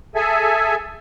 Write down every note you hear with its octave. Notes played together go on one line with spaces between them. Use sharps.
G#4 A4 E5 G#5